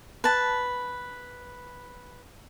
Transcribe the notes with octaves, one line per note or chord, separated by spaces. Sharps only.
B4 A5